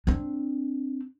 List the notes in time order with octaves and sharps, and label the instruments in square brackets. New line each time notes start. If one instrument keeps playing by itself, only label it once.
[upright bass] C4 D4